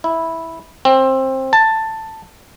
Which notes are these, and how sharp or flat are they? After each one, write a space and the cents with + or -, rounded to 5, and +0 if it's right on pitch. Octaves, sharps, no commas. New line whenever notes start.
E4 -10
C4 +20
A5 +10